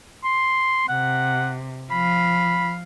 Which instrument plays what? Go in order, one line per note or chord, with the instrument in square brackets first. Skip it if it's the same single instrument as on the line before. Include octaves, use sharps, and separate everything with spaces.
[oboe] C6
[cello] C3 [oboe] F#5
[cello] F3 F5 [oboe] B5